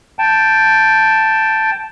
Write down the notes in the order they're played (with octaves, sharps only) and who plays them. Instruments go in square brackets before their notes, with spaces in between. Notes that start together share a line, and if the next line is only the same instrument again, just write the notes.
[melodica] G5 A5